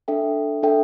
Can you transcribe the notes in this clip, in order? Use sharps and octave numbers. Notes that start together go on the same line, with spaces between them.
D4 A4 E5 G5
D4 A4 E5 G5